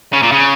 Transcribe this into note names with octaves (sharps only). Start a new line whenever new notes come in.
C#3
A#2
C#3